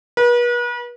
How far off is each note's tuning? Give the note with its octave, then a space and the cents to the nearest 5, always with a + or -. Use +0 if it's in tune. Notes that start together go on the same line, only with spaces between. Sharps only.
B4 -40